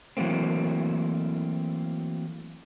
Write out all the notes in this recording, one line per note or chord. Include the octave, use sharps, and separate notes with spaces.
E3 F#3 A3 A#3 C4